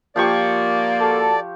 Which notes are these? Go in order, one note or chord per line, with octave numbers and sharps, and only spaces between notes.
F3 A#3 G4 D5 C#6
F#4 A4